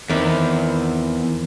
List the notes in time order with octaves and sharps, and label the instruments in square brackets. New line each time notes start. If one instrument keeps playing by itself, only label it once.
[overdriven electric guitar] E2 [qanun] D#3 C4 D5